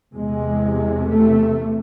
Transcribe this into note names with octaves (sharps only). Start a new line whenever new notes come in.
E2 C3 G#3
A3